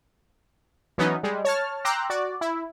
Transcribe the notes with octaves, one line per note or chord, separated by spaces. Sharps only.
E3 F#3 B3 C#4 D#4
G3 G#3
C#5 A5 F6
G5 A#5 C6 D6 E6 F#6
F#4 D5
E4